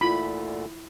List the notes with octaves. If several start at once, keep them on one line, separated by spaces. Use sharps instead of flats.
D2 A#2 D3 E4 F4 B5